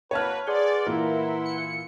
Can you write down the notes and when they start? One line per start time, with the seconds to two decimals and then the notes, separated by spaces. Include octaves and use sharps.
0.11 A#3 F#4 B4 C#5 A5 F6
0.47 G#4 B4 D5 F#5 C6
0.86 A#2 E3 E4 F4 A#4
1.45 C#7